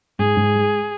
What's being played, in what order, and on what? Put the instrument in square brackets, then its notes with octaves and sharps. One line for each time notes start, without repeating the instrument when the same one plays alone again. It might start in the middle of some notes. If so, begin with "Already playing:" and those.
[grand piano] G#2 [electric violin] G#4
[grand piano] G#2
G#3